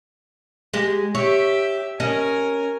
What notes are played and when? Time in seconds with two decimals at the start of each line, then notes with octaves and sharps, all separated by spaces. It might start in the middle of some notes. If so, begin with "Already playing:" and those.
0.73 G#3 G4
1.15 G4 C#5 E5
2.00 C#4 A#4 D#5 G#5